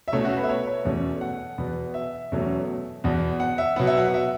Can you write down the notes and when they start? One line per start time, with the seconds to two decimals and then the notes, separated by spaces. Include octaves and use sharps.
0.08 E5
0.12 B2 A3 C#4 C#5
0.25 F#4
0.37 B4
0.43 E5
0.49 C#5
0.67 C#5
0.85 E2 B2 A3 C#4
1.21 F#5
1.58 E2 B2 B3
1.94 E5
2.32 E2 B2 F#3 A3 C#4
3.04 E2 B2 B3
3.40 F#5
3.58 E5
3.76 B2 F#3 B3 F#5
3.87 E5
3.97 F#5
4.14 E5